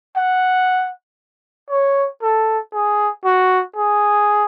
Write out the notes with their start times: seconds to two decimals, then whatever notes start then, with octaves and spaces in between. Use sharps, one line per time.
0.16 F#5
1.70 C#5
2.23 A4
2.73 G#4
3.25 F#4
3.76 G#4